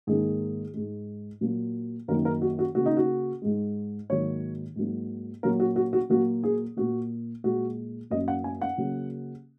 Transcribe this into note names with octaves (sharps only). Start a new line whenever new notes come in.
G#2 D#3 A#3 G#4
G#2 G#3
A#2 F#3 A#3
F#2 D#3 F#3 A#3 A#4
A#4
F#4
F#4
C#3 A#3 F#4
D#4
F#4
G#2 G#3
G#2 D#3 F#3 A#3 C#5
G#2 F#3 A#3
A#2 F#3 A#3 A#4
F#4
F#4
F#4
A#2 F#3 A#3 F#4
G#4
A#2 A#3 F#4
A#2 G#3 F#4
F#2 F#3 A#3 D#5
F#5
G#5
F#5
C#3 F#3 A#3